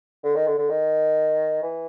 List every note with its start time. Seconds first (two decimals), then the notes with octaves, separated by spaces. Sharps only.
0.24 D3
0.35 D#3
0.47 D3
0.59 D3
0.70 D#3
1.62 E3